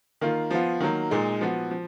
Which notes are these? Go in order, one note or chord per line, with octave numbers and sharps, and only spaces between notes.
D#3 A#3 F4
F3 B3 F4
D#3 F#3 A#3
A#2 G#3 D#4
F3 B3 F#4
F3